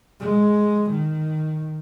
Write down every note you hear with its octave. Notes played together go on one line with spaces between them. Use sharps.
G#3
D#3